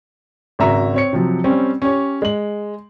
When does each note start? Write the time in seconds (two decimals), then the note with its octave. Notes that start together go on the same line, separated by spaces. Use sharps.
0.59 G#1 C#3 F#4 E5 A#5
0.94 C4 C#5 C#7
1.13 C3 F3 F#3
1.44 G3 C4 C#4
1.82 C#4 G4 C#5
2.22 G#3 F#7